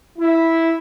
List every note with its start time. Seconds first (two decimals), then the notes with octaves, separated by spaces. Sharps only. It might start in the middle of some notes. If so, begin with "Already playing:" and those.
0.17 E4